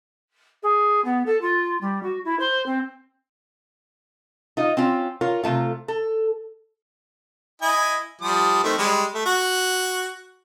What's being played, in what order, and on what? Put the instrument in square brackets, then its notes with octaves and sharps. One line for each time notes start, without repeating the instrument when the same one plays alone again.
[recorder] G#4
B3
A4
F4
G3
F#4
E4
C5
C4
[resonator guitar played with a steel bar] D#4 F4 D#5
C4 C#4 F4
F4 A#4 C#5
C3 D#3 A3 F4
A4
[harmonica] E4 D#5 G#5
F3 G3 D#6
D#3 A3 C4
G3 G#3
A3
F#4